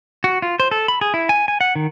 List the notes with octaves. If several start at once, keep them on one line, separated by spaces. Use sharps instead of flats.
F#4
F4
C5
A4
B5
G#4
E4
G#5
G#5
F#5
D#3